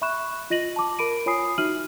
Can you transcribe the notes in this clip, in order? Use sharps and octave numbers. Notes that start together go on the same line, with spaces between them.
E5 B5 C#6 F#6 E7
F4 D#5 A#6 D#7 F#7
A5 D6
A#4 B5 D7 D#7
F4 C#5 G#5 B5 D#6 C7
D#4 F#4 E5 F6 D#7 F#7